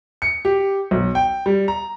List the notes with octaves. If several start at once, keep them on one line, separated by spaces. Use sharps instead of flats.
C#7
G4
B1
G5
G3
A#5